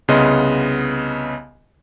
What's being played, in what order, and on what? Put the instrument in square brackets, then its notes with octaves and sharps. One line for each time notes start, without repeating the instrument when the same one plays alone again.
[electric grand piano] C2 C#3 B3 D#5 C6